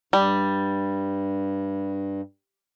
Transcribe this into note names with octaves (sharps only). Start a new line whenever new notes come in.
G2 G3